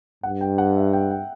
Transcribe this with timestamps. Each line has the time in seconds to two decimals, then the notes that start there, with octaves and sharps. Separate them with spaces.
0.23 G2 F#5
0.41 G5
0.58 F#5
0.76 E5
0.93 G5
1.11 G5